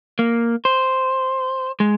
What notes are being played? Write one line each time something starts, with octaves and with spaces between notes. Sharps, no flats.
A#3
C5
G#3